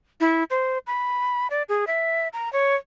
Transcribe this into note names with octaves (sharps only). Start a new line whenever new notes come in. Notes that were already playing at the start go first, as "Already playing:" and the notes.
E4
C5
B5
D5
G#4
E5
A#5
C#5